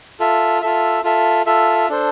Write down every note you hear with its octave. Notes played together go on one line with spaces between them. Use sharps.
F4 A4 E5
F4 A4 E5
F4 A4 E5
F4 A4 E5
D4 A4 C5